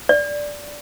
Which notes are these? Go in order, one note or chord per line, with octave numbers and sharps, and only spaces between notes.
D5